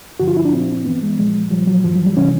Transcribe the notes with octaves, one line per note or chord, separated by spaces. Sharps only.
G2 D3 F3 F#4
F4
E4
D4
A#2 F3 C4
G2 E3 B3
G#3
A#2 F3 G#3
A#2 F3 G3
F#3
G2 E3 F3
F#3
G3
C3 E3 C#4